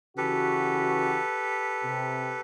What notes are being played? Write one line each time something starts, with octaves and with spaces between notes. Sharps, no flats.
C#3 E3 F#4 G4 A4 B4
C3